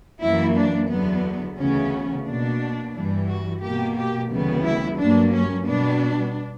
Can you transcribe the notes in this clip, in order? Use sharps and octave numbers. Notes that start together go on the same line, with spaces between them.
F#2 E3 A#3 E4
D4
E2 D3 F#3 B3
D2 C#3 E3 B3 C#4
B2 A#3 D4
G2 E3 G3
F#4
B2 A#3 G4
G4
D2 C#3 E3 G3 B3
E4
G2 F#3 A#3 D4
C#4
B2 G3 B3 D4